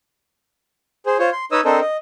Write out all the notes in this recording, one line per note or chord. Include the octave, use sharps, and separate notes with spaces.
G#4 C5
F4 C5 C#5
C6
D#4 B4 C#5 D#5 D#6 E6
C4 D4 A4 A#4 C5 D#5
D#5